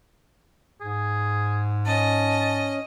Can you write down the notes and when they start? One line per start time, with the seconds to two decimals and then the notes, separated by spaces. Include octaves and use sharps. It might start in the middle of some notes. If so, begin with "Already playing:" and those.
0.81 G#2 G#4
1.86 C#4 D#5 A5